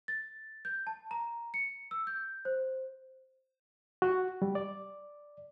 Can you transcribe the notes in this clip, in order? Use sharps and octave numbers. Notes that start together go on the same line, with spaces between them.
A6
G6
A5
A#5
C#7
E6
G6
C5
F#4
G3
D5